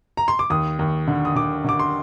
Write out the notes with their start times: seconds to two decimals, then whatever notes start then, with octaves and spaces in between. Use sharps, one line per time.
0.17 A#5
0.28 C6
0.39 D6
0.50 D#2 D#6
0.79 D#2
1.08 D3
1.25 D#6
1.35 D3 D6
1.64 D3 D6
1.79 C6